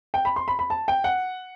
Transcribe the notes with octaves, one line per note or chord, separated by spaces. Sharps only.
G5
B5
C6
B5
B5
A5
G5
F#5